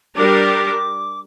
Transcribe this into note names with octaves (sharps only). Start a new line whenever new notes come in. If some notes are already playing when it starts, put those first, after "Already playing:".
G3 D4 G4 A#4 D6